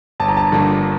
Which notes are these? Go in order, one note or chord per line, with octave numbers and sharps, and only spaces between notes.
G1 A5
A#5
A5
G2 D3 F3 A#3